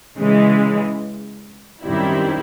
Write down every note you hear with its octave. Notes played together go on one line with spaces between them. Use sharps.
C#3 E3 G#3
F#2 D#3 G3 C4 E4